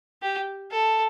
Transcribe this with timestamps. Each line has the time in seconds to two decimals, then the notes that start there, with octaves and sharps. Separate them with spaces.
0.22 G4
0.71 A4